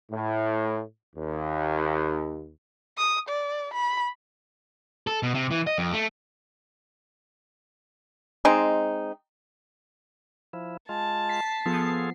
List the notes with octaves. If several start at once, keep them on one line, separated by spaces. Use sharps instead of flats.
A2
D#2
D#6
D5
B5
A4
B2
C3
E3
D#5
F2
A3
G#3 C4 D#4
F3 E4
G#3 F4 A5
B6 C7
F3 B3 F4 G#4 A4 C7